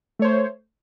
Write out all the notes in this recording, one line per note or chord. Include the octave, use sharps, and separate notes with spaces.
A3 C5 C#5